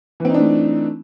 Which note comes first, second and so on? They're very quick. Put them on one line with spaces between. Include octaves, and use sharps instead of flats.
E3 C4 D#4 D4 A3